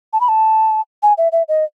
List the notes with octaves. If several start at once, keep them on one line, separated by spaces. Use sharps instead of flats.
A5
B5
A5
G#5
E5
E5
D#5